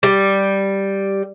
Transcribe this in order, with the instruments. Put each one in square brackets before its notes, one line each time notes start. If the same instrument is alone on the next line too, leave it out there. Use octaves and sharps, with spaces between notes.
[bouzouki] G3